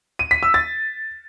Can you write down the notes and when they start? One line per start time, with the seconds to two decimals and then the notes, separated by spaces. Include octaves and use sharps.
0.19 D#7
0.31 B6
0.43 E6
0.54 A6